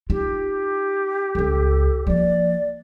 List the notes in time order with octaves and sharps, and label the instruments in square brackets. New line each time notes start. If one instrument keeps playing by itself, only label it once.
[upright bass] D#4 F4 [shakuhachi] G4
[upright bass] E1 C#2 [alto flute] A4
[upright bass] F3 A#3 [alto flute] D5